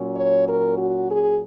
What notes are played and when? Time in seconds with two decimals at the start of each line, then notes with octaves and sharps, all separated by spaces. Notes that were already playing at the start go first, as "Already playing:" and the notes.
Already playing: A#2 F#3 C#4
0.15 C#5
0.47 A#4
0.78 F#4
1.09 G#4